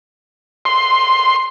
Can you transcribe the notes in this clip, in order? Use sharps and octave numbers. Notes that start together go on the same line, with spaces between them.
C6